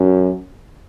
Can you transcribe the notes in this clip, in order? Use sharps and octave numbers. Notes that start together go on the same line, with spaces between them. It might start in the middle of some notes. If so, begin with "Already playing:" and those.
Already playing: F#2